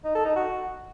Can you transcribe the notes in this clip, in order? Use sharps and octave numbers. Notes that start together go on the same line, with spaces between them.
D#4
A4
D#4
F#4